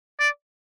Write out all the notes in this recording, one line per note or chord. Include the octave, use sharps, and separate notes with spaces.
D5